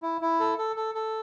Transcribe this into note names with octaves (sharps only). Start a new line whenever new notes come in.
E4
E4
A4
A4
A4
A4